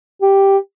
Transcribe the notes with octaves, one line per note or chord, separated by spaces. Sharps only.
G4